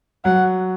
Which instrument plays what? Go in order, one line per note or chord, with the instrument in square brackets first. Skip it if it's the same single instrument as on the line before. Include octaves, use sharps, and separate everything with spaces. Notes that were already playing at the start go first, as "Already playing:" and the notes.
[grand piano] F#3 [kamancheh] F#5